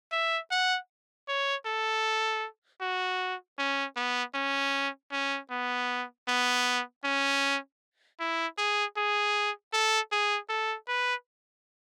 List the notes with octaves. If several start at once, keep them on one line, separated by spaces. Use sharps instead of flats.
E5
F#5
C#5
A4
F#4
C#4
B3
C#4
C#4
B3
B3
C#4
E4
G#4
G#4
A4
G#4
A4
B4